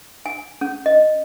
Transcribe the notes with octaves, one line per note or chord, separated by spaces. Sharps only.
G#5
C#4
D#5